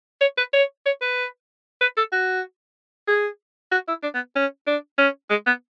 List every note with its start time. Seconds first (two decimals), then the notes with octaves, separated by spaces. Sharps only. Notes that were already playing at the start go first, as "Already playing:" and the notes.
0.21 C#5
0.38 B4
0.53 C#5
0.86 C#5
1.01 B4
1.81 B4
1.97 A4
2.12 F#4
3.08 G#4
3.72 F#4
3.88 E4
4.03 D4
4.15 B3
4.36 C#4
4.67 D4
4.98 C#4
5.30 G#3
5.47 B3